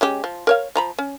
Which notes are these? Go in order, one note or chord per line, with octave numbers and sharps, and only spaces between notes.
G#3 C#4 G4
F3
A#4 C#5 F5
F3 A#5 B5
C#4